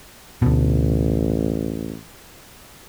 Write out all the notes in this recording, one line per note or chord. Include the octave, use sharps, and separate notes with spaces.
A1 D2 B2